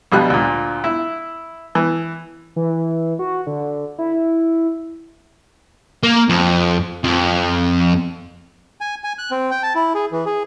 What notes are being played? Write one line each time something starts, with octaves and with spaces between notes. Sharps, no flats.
A#1 B2 G3 F#6
D2 A#2
E4
E3
E3
F#4
D3
E4
A#3
F2
F2
G#5
G#5
F#6
C4
G5
A5
E4
G#4
E3
G#4